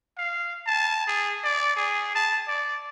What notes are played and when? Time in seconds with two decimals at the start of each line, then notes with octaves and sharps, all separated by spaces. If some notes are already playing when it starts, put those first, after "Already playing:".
0.18 F5
0.66 A5
1.07 G#4
1.44 D5
1.76 G#4
2.15 A5
2.48 D5